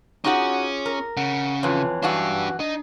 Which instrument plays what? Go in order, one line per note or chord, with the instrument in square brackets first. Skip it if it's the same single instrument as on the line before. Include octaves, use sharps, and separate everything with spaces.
[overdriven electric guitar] C#4 [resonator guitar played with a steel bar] D#4 F#4 F#5 [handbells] F4 G#4 D6
[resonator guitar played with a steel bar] A#4
[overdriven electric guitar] C#3 [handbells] F#5
[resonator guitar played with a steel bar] F2 E3 [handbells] F4 B4 C#5
[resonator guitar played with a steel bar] F#2 E3 F#4 [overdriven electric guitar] D4 G4 [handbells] F5 A5 E6
[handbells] D4 [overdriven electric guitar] D#4